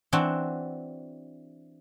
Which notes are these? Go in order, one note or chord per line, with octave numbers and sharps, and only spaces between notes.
E3 C4 D4 F#4